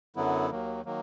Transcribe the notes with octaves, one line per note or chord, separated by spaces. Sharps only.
F#2 D3 F#3 B3 E4
D#2 D#3 F#3 A#3
D#3 F#3 A#3